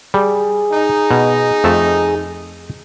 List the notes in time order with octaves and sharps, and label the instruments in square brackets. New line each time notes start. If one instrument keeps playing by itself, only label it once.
[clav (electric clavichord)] G3 [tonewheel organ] G#4
[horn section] D#4
[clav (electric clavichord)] B2
F2 A3 A5